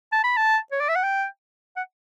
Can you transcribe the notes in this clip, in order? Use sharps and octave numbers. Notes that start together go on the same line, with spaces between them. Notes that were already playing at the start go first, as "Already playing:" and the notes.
A5
B5
A5
C#5
D5
E5
F#5
G5
F#5